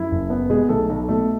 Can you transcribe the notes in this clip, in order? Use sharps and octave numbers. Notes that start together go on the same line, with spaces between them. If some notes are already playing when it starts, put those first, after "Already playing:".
Already playing: F#2 E4
F#1
B3
B2 G#3 G#4
B1 A3 A4
B1
B2 A3 A4